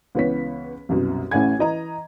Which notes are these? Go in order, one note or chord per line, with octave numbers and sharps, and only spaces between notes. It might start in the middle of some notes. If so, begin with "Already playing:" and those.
C#2 E3 B3 C#5 B6
C2 F#2 B2
A1 A2 C#4 F#5 G#5 G#6
E3 D#5 A#5